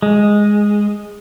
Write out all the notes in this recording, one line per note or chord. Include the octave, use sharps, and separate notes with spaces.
G#3